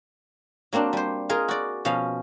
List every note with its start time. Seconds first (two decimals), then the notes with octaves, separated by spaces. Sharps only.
0.73 F#3 A#3 C4 D4
0.93 G3 C5
1.29 F4 G#4 A#4 D#5
1.48 F#4 D5
1.85 B2 F3 C#4 F5